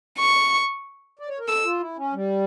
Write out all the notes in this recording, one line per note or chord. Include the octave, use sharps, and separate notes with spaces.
C#6
D5
C#5
A#4
A4 E6
F4
E4
C#4
G3